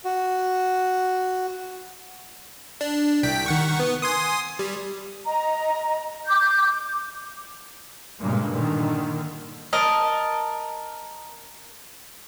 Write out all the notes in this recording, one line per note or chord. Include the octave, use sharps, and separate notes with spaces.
F#4
D4
C2 G5 B6
D#3 F#5 C#6
B3
G#5 C6 D#6
G3
D#5 A#5
D6 G6
G2 A#2 C#3 G#3 A#3
A#2 D3 D#3
A#4 D#5 A5